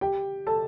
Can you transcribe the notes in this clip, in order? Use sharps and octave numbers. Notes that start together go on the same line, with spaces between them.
G4 G5
A4 A5